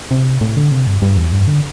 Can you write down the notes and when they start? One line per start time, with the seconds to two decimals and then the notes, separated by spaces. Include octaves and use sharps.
0.11 C3
0.41 A2
0.57 D3
0.71 C3
0.87 G2
1.02 G2
1.17 E2
1.32 G2
1.47 D3